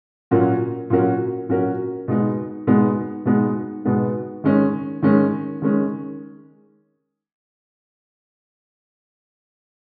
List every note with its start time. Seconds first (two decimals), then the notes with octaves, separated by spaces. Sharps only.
0.31 A#2 F#3 C#4 F#4 A#4
0.90 A#2 F#3 C#4 F#4 A#4
1.49 A#2 F#3 C#4 F#4 A#4
2.08 B2 G#3 B3 D#4
2.67 B2 G#3 B3 D#4
3.25 B2 G#3 B3 D#4
3.85 B2 G#3 B3 D#4
4.44 D#3 G#3 C#4
5.02 D#3 G#3 C#4
5.62 D#3 G#3 C#4